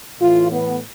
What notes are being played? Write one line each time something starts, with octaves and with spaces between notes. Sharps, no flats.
A2 E3 F4
B3